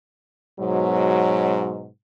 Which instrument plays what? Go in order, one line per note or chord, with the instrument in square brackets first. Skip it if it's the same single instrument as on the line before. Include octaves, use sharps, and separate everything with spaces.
[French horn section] G#2 B2 F#3